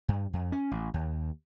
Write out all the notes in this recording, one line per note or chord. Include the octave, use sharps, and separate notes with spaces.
G2
F2
C#4
A1
D#2